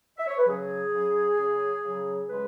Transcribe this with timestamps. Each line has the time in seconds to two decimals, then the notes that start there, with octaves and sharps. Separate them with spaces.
0.17 E5
0.27 C#5
0.37 B4
0.47 C#3 F#3 G#4
0.92 C#3 F#3
1.37 C#3 F#3
1.83 C#3 F#3
2.28 C#3 G#3 B4